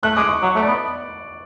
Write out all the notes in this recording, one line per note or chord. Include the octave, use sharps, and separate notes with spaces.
A3 F#6
G#3 D6
C#6
F#3 C#6
A3
D5
B3